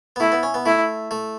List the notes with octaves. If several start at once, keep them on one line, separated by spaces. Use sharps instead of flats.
B3
A3 E4
B3
C#4
B3
A3 E4
A3